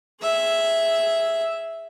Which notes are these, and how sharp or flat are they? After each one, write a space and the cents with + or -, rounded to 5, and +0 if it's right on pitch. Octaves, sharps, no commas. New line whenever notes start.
G#4 +0 E5 +0